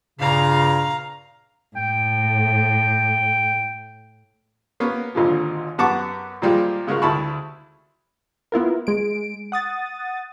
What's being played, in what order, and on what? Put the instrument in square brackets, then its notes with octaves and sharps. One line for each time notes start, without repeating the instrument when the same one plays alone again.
[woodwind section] G2 A#2 C#3 [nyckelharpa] F5 A#5
[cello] A2 [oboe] G5
[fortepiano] A#3 B3 C#4
G#1 A#2 D3 F3
F#2 B3 F#5 A5 C#6 D6
A#2 F3 G3 G#3 F4
C#3 G#3 F4 F#4 A#4
D2 E4 A5 B5 C#6
[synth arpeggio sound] B3 E4 F4 A#4
G#3 D7
F#5 D#6 A6